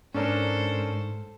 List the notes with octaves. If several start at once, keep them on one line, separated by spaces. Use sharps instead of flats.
G#2 C#4 D4 A4 A#4 C5